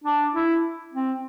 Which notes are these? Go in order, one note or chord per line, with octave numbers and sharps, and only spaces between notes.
D4
E4
C4